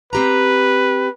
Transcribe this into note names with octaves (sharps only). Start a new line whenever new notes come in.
C4 G4 B4 A#5